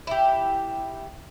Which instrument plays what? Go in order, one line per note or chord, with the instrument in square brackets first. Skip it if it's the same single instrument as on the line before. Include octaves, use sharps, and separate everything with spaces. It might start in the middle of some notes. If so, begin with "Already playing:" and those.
[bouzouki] E4 G4